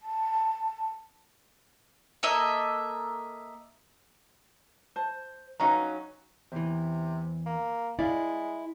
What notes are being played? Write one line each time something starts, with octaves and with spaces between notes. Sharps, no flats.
A5
A#3 A4 D#5 E5
C5 A5
F#3 C#4 D#4 B4 F5 A#5
E2 C3 E3
A#3
G#3 E4 D5 F5